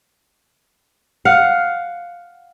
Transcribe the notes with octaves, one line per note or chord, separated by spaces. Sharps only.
F5 F#5